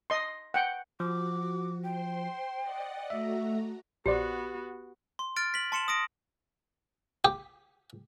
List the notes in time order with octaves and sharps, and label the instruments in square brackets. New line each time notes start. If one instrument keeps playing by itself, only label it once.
[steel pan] D#5 C6
F#5 G5
[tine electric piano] F3 [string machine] F#4 [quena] D6
[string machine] C5 C6 [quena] G5
[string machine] D5 D#5 F#5
[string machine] A3 F#4 A#5 [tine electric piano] E5
[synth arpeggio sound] A#1 C5 D5 [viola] B3 F#4 [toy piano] G4
[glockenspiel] C6
F6 A6 D7
B6 F#7
A5 C6 C#7 E7 F#7
D#6 A#6 D7
[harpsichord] G4